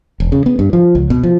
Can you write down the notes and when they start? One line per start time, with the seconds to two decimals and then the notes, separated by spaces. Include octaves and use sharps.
0.20 E1
0.32 C#3
0.46 B3
0.59 G2
0.73 F3
0.95 C#2
1.10 B2
1.23 F3